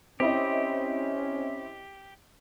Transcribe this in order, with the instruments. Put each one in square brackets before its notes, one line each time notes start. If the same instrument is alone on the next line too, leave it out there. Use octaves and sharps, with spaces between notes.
[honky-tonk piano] C4 E4 D#5 [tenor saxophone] C#4 [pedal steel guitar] G4